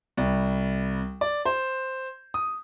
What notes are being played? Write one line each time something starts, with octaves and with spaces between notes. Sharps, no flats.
C2
D5
C5
D#6